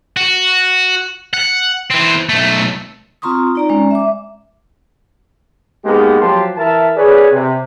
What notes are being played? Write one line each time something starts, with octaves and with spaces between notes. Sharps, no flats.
F#4
F#5
E3 C4
B1 A3
C4 F4 A#5 C6 C#6 D#6
D#4 D5 A#5
G#3 C#4 D5 A#5
E5 D6
G#3 A#3 B3 D#4 G4
F3 F#3 G4 A5 C6
E3 A#4 E5 A5
G#4 B4 C#5 D5
C3